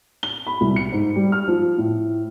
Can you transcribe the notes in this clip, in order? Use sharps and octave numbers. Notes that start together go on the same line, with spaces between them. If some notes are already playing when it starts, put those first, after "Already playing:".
G7
B5
C2
C#7
G#2
G3
F6
F3
A2